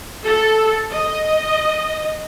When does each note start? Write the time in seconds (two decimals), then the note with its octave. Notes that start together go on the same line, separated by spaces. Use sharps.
0.25 A4
0.91 D#5